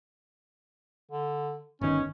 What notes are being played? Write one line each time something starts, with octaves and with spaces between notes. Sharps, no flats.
D3
G1 D#3 C#4